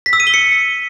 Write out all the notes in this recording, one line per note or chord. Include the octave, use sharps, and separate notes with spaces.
B6
E6
D#7
G7
C#7